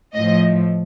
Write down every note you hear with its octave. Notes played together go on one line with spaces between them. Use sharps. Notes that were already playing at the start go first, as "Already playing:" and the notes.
A2 F3 D#5